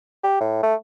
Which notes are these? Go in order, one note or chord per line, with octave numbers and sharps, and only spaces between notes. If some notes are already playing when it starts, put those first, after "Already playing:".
G4
A2
A3